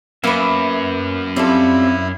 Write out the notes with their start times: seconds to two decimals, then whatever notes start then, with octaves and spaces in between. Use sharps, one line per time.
0.24 F#2 A#3 B3 B4 E5
1.36 G3 C4 E4 F4 A4